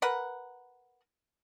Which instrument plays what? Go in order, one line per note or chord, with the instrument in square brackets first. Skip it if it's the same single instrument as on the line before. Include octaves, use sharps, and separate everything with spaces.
[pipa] A#4 B4 F#5